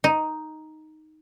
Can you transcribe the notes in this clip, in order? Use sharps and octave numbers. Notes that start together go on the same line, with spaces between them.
D#4